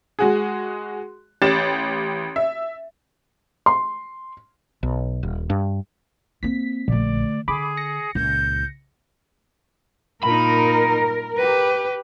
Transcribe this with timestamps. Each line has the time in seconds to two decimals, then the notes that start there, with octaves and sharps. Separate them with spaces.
0.19 G#3 F#4 G#4
1.42 A1 G4 A6 E7
2.36 E5
3.66 C6
4.83 B1
5.23 D#1
5.50 G2
6.43 A#3 C4 B6
6.88 A#1 D3 A3 D5
7.48 D3 G#4 B5 D6
7.77 A#6 C#7
8.15 C#2 A#2 G6
10.24 A#2 D#4 A#4 B5
11.37 G4 B4